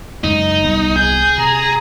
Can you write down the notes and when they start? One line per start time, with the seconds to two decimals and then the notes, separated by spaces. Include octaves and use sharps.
0.24 F#2 C#3 G#3 D#4
0.64 C2 G3 B3
0.96 G#4 G6
1.38 C3 A#5